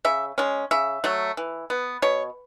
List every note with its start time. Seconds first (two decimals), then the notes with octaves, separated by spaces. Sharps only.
0.05 C#3 E5
0.38 G#3 C#4
0.71 C#3 E5
1.04 F#3 A3
1.37 E3
1.70 B3
2.02 B2 C#5